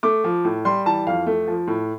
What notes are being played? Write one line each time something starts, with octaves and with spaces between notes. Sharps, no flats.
A3 D6
F3
A2
G3 C6
E3 A5
F2 F5
A3
F3
A2